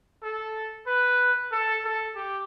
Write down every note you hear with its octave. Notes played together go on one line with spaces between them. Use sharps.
A4
B4
A4
A4
G4